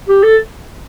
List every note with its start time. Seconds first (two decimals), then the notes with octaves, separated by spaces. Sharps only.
0.09 G4
0.23 A4